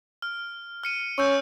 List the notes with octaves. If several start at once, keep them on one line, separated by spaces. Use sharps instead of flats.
F6
F6 C#7 D#7
C#4 C#6 E6 G6